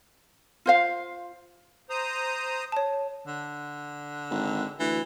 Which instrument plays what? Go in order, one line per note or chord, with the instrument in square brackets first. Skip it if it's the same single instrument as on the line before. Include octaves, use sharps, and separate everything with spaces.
[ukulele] F4 C5 F5
[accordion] C5 A#5 D#6
[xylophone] C#5 A5
[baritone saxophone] D3
[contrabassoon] G#1
[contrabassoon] D2 [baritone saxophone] E3